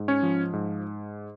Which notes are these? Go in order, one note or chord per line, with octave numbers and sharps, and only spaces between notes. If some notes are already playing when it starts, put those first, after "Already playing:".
Already playing: G#2
C#4 C#5
F3
G#2